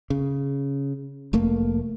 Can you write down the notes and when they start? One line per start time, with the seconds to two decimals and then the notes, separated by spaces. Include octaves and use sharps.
0.10 C#3
1.33 F1 A3 A#3